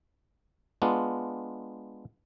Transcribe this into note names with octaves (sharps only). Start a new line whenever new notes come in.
G#3 B3 D4 F4